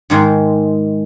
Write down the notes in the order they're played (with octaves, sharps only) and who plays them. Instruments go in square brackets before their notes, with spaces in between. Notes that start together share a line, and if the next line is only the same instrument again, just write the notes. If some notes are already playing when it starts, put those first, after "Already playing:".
[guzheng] G#2 D#3 G#3